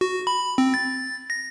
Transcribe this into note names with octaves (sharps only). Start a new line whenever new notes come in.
F#4
B5
C4
A6
A#6